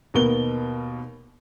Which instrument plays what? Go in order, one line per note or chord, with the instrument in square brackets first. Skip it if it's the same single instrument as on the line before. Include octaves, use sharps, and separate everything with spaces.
[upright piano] D#2 B2 A#4 G7